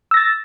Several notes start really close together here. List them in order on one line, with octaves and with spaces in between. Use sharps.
E6 A#6 A6